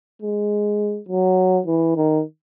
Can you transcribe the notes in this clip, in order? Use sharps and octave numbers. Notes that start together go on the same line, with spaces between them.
G#3
F#3
E3
D#3